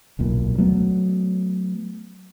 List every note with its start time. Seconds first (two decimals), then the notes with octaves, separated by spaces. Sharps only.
0.19 D1 B1 A#2
0.58 F#3 A3 B3